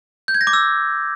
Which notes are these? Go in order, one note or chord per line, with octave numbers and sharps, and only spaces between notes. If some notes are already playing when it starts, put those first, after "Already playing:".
G6
G#6
A#6
D6
E6